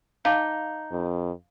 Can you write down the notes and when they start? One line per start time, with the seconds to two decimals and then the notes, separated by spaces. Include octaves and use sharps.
0.25 D#4 F5 A5 D6
0.92 F2